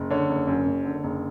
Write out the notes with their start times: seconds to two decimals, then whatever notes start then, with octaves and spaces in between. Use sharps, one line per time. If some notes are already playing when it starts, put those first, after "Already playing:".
Already playing: F#1
0.10 D3 C#5
0.29 F#1
0.47 F#2
0.66 F#1
0.84 D3
1.04 F#1